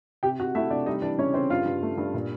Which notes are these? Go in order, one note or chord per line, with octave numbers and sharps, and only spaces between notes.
C3 G4 G5
C3 F#4 F#5
A3 E4 E5
C3 D4 D5
G3 D#4 D#5
E3 D4 D5
C#3 C#4 C#5
C#3 C4 C5
G2 F4 F5
G2
A3
G2
A#2